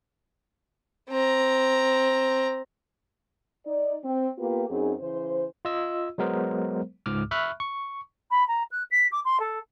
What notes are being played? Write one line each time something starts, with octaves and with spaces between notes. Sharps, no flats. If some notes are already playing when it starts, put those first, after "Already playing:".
C4 A#5
D#4 D5
C4
A#3 B3 F4 G4 B4
F#2 C4 D#4 G#4
C#3 E3 C5
F4 D#5 E6
F#3 G#3 B3 A#4 C5
C#2 G#2 D6 F6
E5 B5 C#6 F6 F#6
C#6
B5
A#5
F#6
B6
D6
C6
A4